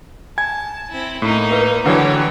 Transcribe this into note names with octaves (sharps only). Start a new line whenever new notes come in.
G#5 A5 G#6
C4 E4
A2 A#3 D#4
A#4 B4
D3 E3 F#3 G4 A4 B4 C#5 F#5